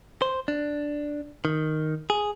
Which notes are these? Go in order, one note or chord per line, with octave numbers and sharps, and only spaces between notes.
C5
D4
D#3
G#4